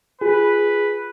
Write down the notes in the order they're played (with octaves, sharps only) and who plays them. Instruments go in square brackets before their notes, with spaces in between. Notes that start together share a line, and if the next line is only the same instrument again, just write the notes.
[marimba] F4 [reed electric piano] G#4 [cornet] B4